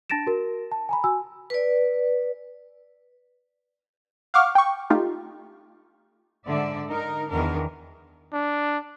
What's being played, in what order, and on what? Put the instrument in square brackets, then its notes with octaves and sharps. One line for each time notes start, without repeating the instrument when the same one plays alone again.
[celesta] D4 A5 A6 A#6 D7 E7
F#4 A#4
A5
G#5 A#5 B5
F#4 G#5 E6
[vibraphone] B4 D5
[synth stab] F5 F#5 C#6 D6 F6
G5 C#6
A3 D#4 F4 G4
[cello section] G#2 D3 D5 E5
D#4 A#4
E2 D#3 D4 A#4
[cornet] D4